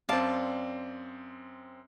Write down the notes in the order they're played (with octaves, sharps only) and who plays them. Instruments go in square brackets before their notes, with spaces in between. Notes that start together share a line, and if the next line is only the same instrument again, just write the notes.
[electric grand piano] F#2 C4 [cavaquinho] D5 F5 A5